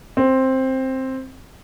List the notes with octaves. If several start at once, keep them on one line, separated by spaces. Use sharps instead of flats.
C4